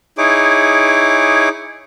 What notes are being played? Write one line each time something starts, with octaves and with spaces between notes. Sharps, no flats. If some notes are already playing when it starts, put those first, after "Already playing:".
D#4 E4 G#4 C#5 D6